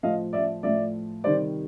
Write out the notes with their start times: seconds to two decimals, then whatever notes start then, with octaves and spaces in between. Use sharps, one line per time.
0.03 A2 F3 D#5 F5
0.33 D5 E5
0.63 A2 F3 D5 E5
1.24 C3 D#3 G3 C5 D5